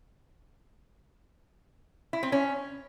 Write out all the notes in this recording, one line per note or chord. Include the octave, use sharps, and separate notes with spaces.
E4
C4
C#4